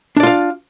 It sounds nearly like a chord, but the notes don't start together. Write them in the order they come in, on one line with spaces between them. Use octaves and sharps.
D4 D5 F4 F5